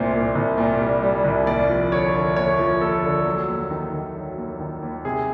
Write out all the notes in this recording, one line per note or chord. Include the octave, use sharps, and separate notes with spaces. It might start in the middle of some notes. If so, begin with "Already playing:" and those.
Already playing: C2 A#2 C5
A#2
C2
A#2
G3
G3
C2
D#2 D5
F3
D3 C#5
D3
D#2 C#5
F3
D#2 A4
D3
F#3
D#2
D#3
D#3
F#3
D#2
D#3
D#2
C3 G#4